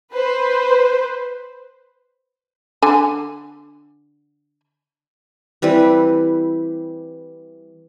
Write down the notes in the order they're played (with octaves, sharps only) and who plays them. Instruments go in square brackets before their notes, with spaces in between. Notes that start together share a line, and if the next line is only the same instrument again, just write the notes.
[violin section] B4 C5
[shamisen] D3 G#5
[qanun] E3 G3 C4 B4